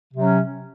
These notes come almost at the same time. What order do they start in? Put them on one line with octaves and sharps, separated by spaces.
C3 F#3 C#4